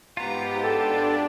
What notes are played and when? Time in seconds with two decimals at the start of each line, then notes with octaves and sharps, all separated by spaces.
0.17 G#2 B3 F4 G4 A#5
0.64 D4 G4 A4 A5